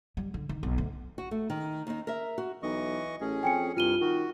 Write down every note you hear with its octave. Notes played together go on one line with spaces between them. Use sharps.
G3
D3
D#3
B1
D2
F#4
A3
D#3
D#2 D#4
A#4 E5
F#4
B1 E3 D#5 C#6
A1 C#4 G#4
F2 G5 G#5 C#7
C2 G2 F4 F6 D#7 G7
D#3 F#4